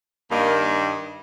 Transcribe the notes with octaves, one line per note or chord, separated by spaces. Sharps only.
G2 D#3 G3 A#3